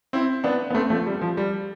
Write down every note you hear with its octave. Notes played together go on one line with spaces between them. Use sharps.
C4 E4
B3 D4
B3
A3 C4
F3 A3
G3
F3
G3